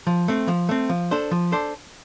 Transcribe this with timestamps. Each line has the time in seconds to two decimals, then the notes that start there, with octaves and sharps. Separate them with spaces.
0.07 F3
0.28 A3 C4
0.48 F3
0.69 A3 C4
0.89 F3
1.11 D4 A4 C5
1.31 F3
1.52 D4 A4 C5